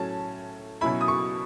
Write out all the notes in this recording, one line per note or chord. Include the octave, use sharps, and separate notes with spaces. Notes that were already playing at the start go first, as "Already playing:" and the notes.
Already playing: A2 F#3 C#4 A5
B2 F#3 C#4 E4 B5
D#6
C#6